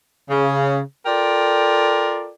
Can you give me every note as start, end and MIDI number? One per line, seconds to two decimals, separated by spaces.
0.30 0.80 49
1.06 2.30 65
1.06 2.30 69
1.06 2.30 70
1.06 2.30 74
1.06 2.30 79